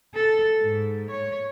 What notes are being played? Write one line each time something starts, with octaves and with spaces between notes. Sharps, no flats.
A4
G#2
C#5